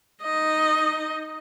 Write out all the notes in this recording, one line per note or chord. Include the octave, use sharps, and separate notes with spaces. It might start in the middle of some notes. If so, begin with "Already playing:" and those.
D#4 D#5